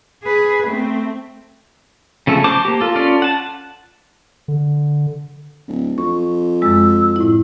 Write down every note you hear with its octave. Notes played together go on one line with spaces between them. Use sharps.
G#4 B4
A3 C4
C#3 F3 A3 A4
F#4 C5 A5 D6
A#3 G4
F4 A4
C#4 F4 A4 D5
F#5 A5
D3
D1
F2 C#6
F#2 G#3 E6
A2 E4